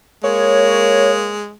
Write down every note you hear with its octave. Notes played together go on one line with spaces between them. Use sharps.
G#3 A#3 C#5